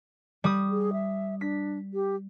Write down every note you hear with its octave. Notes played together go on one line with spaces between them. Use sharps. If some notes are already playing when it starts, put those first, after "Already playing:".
G3 D#6
G#4
E5
D4 B6
G4